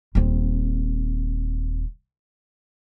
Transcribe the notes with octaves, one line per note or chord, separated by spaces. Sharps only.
D#1 C4